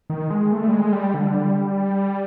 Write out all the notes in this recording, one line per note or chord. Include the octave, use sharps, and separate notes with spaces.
D#3
G#3
A3
G3
G#3
G3
D3
G3